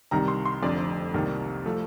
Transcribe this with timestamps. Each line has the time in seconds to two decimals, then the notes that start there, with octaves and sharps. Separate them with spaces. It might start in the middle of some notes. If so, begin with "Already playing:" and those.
0.11 C2 C3 D#3 G3 A#5
0.28 C6
0.45 C6
0.63 F1 F2 D3 D5
1.14 C2 C3 D#3 G3 A#3
1.66 F3 A3